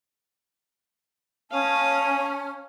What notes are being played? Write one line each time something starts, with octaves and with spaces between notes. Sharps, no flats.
C#4 F5 A5 D#6